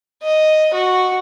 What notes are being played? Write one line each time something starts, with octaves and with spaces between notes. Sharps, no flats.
D#5
F#4